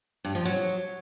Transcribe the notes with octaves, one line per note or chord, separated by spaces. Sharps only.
G2
F3
F#3